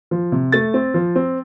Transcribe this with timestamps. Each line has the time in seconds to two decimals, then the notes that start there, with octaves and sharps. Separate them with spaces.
0.11 F3
0.32 C3
0.52 A3 A6
0.74 C4
0.94 F3
1.16 C4